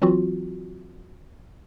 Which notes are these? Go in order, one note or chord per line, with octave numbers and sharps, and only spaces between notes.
E3 F#3 C4 F4 F#4